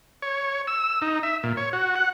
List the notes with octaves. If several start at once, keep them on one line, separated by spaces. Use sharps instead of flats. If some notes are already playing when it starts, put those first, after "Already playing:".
C#5
E6
D#4
E5
A#2
C#5
F#4
F#5